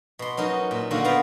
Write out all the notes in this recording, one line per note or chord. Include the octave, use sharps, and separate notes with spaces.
B2 C6
F#3 C#4 D#4 A#4
A#2
D3 D#3 A#3 F4 F#4
B3 D5 F5 G5 A#5 B5